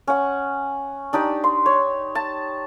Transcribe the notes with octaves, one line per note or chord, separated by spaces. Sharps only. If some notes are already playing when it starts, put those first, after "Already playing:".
C#4 F#5
D4 D#4 G4 D5
C6
C#5
A5